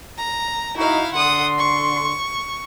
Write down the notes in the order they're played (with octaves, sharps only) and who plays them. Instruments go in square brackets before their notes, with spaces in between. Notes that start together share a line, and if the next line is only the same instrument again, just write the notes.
[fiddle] A#5
[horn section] D#4 F#4 [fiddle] E4 F5
[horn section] D3 C6 [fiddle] F#5 D#6
[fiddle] C#6